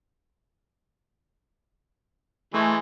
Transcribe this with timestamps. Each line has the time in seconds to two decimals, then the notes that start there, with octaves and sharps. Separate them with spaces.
2.54 E3 G#3 A3